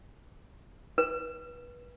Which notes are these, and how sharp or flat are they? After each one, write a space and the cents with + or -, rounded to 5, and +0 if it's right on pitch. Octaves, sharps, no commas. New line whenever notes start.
B4 -25